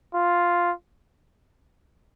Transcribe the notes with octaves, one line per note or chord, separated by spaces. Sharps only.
F4